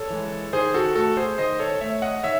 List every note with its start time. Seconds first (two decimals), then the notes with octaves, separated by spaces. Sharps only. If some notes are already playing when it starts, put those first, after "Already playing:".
Already playing: A4 C#5
0.10 E3 G#3
0.53 D#3 G#4 C5
0.74 F#4 A4
0.95 A3 F#4 A4
1.17 G#4 C5
1.38 D#3 C5 D#5
1.59 A4 C#5
1.81 A3 C#5 E5
2.02 D#5 F#5
2.23 D#3 C#5 E5